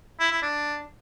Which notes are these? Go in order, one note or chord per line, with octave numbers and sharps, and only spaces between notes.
E4
E4
D4